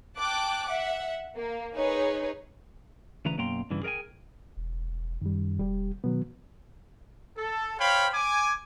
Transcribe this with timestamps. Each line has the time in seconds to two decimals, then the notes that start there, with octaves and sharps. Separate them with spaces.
0.17 G5 A5 D6 F#6
0.69 E5 F#5
1.36 A#3
1.76 D#4 G#4 B4 C#5
3.25 D2 C#3 E3 B4 A#5
3.38 F#2 B2 A#3 G5 A#5 C6
3.70 G2 C#3 E3
3.83 G#4 A#4 D5 G5 G#5
4.57 E1
5.21 F#2 D#3 G3
5.59 E1 G3 G4
6.04 B2 D#3 F#3 B3
7.38 A4
7.79 C5 C#5 F5 G5 B5
8.14 G#5 D6